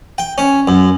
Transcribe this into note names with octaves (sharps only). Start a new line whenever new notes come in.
G5
C#4
F#2